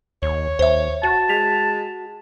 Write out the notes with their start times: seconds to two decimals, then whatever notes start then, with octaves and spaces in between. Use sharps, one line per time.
0.22 D#2 C#5
0.59 D#2 C5 E5
1.03 F#4 A5
1.29 G#3 B6 F7